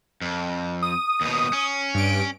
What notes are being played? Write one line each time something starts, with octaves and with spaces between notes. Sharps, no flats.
F2
D#6
D#2 B2
C#4
G2 D7